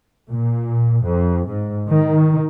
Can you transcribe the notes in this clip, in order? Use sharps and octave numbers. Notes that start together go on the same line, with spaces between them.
A#2
F2
G#2
D#3